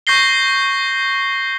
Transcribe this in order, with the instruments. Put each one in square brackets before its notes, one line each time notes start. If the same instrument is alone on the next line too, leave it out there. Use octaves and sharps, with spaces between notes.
[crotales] C#6 G6 A#6 C7 G7